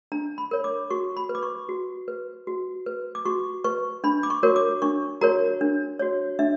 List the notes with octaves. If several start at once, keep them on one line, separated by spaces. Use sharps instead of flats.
D4 A#5
B5
A#4 C#5
D6
F#4 C#6
B5
B4
D6
C#6
F#4
B4
F#4
B4
D6
F#4 C#6
B4 C#6
D4 B5
D6
C#6
F#4 A#4 C#5
D6
D4 C#6
F#4 A#4 C#5 A#5
D4
F#4 C#5
D4 E5